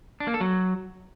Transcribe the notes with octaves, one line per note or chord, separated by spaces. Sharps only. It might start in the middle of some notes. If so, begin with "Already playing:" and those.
D4
A#3
A4
F#3